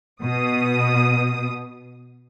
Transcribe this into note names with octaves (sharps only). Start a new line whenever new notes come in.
B2 D#6